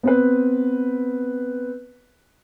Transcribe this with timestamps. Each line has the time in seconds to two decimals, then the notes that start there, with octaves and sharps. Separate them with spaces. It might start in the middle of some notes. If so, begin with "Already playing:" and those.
0.03 B3 C4 B4